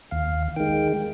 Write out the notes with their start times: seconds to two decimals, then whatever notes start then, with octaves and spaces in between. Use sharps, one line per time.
0.11 D#2 F5
0.56 D#3 G#3 G5